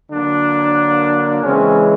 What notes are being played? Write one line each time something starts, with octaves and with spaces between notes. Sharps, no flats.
D3 F#3 A#3 D4
C#3 E3 G#3 C4 C#4